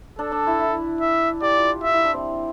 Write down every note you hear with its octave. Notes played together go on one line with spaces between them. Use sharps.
D4 A4
D4
E4
E4
E5
G4 D5
F4
G4
F4 E5
E4
D4
C4